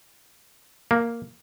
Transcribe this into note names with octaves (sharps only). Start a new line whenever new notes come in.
A#3